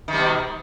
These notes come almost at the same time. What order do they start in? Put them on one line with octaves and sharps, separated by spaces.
D#3 G3 B2